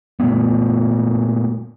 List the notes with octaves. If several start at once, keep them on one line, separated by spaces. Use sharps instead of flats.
A#2 G3 A3 B3